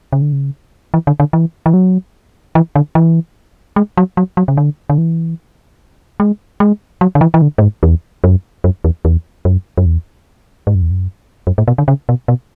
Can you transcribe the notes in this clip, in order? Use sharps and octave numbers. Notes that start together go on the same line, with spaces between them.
C#3
D3
C#3
E3
D3
D3
E3
E3
F#3
E3
D3
E3
G#3
F#3
F#3
F#3
C#3
D3
D3
E3
G#3
G#3
F#3
D3
E3
E3
D3
A2
G#2
E2
F#2
F#2
E2
E2
F#2
F#2
E2
G#2
F#2
E2
F#2
F#2
A2
B2
D3
C#3
B2
B2